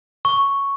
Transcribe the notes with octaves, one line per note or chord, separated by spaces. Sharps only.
C#6